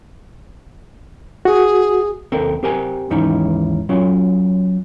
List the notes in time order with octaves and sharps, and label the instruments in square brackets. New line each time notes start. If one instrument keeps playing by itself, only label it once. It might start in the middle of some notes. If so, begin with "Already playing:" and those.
[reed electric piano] F#4 [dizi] G#4
[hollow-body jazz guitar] D#2 C4 A4 A#4
C4 G4 A#4 G#5
D#2 G#2 E3 C#4 D#4
F#3 C#4 F4